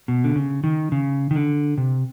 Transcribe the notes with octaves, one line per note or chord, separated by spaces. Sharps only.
B2
D3
C#3
D#3
C#3
D#3
D3
C3